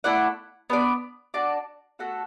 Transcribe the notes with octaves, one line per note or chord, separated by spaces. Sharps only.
A3 E4 D5 F#5
B3 D4 B4 D5
D4 F#4 D5 A5
A3 F#4 A4 F#5